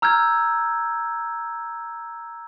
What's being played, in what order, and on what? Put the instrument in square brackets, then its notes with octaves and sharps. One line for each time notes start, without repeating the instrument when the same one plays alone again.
[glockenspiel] A#5 E6 F6 G6 G#6